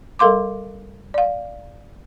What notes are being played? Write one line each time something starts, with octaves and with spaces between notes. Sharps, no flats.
G3 A4 A#4 F5 C6 D6
D5 F5